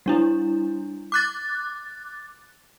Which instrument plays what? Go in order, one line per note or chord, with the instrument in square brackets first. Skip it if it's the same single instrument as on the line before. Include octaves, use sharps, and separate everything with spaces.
[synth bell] G3 D4 E4
D6 F#6 A6